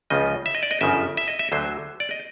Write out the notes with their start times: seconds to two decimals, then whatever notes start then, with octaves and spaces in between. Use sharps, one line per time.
0.10 C#2 C#3 F3 D#5
0.46 E5
0.55 D#5
0.63 D5
0.71 D#5
0.81 G1 F#2 C#3 F3 E5
1.17 E5
1.28 D#5
1.39 E5
1.52 D2 D3 F#3 C5
2.00 D5
2.11 D#5